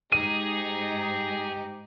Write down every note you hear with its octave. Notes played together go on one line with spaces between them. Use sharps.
G#2 D#4 G4 G#4 D#7